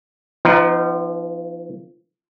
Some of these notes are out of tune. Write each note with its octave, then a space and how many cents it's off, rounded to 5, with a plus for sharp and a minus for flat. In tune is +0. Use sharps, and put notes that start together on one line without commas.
F3 -25 B3 +30 D#4 +0